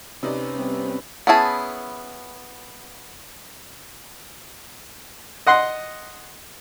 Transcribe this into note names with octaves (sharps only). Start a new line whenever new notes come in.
C3 C#4 D#4 B4 D5
G3 B3 C4
B3 C#4 E4 G#4 A5
D#5 F#5 C6